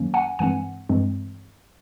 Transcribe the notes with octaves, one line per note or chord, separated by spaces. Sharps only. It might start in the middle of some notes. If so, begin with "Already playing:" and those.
Already playing: F#2 D#3 F#3 A#3 C#4
F#5 G#5
G2 E3 G#3 C4 F#5 G#5
G2 E3 G#3 C4